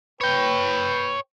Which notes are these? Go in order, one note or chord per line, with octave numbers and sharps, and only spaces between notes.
B4 C#5 G5